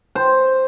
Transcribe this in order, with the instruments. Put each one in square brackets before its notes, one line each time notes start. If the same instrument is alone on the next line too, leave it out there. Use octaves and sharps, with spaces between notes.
[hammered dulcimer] C5